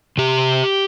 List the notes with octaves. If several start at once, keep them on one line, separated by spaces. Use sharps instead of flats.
C3 G4